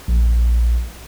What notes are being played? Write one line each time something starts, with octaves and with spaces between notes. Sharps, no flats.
A#1